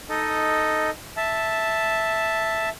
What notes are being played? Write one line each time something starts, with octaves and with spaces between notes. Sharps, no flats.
D#4 A4 D#5
E5 A5